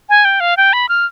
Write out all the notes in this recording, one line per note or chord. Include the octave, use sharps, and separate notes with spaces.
G#5
G5
F5
G5
B5
F6